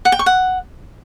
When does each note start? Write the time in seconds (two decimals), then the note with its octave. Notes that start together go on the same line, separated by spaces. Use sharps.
0.05 F#5
0.12 G5
0.19 C#6
0.26 F#5